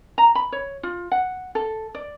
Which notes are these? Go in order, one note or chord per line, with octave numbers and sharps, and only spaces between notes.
A#5
B5
C#5
F4
F#5
A4
D5